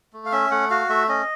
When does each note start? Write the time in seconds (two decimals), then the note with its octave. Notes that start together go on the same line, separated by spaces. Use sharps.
0.13 A3
0.25 F5
0.32 C#4 E5
0.51 A3 F#5
0.70 F#4 F5
0.89 A3 E5
1.09 C#4 D#5